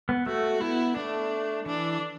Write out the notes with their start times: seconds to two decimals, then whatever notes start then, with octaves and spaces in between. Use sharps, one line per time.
0.09 B3
0.26 A3 F#4
0.61 B3 E4
0.97 A3 D4
1.66 E3 D4